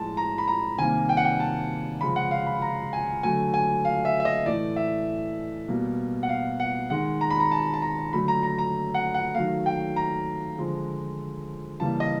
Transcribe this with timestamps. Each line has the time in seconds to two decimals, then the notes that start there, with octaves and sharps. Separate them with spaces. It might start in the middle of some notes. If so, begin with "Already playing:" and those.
Already playing: A2 F3 G#3 A5
0.17 A#5
0.38 B5
0.48 A#5
0.78 C3 D#3 G3 A#3 G#5
1.09 G5
1.17 F#5
1.25 G5
1.40 A5
2.01 C#3 F3 G#3 B5
2.16 F#5
2.31 F5
2.47 B5
2.62 A#5
2.93 G#5
3.23 D3 F#3 A3 G#5
3.54 G#5
3.85 F5
4.05 E5
4.20 E5
4.25 D#5
4.46 A2 E3 A3 D5
4.76 E5
5.68 B2 G3 A#3
6.23 F#5
6.29 F5
6.60 F#5
6.90 D#3 G#3 F#5
7.21 A#5
7.30 B5
7.40 A#5
7.52 A5
7.74 A5
7.82 A#5
8.13 D3 F#3 A3 B5
8.28 A#5
8.43 A#5
8.59 A#5
8.94 F#5
9.14 F#5
9.35 D#3 F#3 A3 F5
9.66 G5
9.96 A#5
10.58 D3 F3 G#3
11.80 C#3 E3 G3 A#3 A5
12.00 D#5